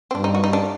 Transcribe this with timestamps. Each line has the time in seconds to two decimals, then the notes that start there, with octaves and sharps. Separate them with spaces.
0.11 C4
0.15 G2 D4
0.24 D#4
0.35 F#4
0.44 D#4
0.53 D4